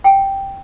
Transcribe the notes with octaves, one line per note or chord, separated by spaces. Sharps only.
G5